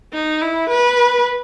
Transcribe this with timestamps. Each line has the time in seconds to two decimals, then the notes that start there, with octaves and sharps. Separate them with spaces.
0.13 D#4
0.41 E4
0.70 B4